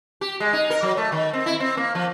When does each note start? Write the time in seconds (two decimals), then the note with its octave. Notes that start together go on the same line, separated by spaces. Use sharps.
0.21 G4
0.40 G#3
0.53 D#4
0.70 A#4
0.83 F#3
0.97 A3
1.12 D#3
1.33 C4
1.46 E4
1.60 C4
1.77 A#3
1.95 F3